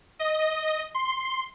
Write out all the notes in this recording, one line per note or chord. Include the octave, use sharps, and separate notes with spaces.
D#5
C6